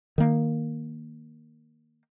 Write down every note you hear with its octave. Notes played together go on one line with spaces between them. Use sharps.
D#3 A#3